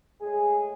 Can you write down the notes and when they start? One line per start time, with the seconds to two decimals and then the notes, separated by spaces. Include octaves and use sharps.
0.21 A2 G#3 G#4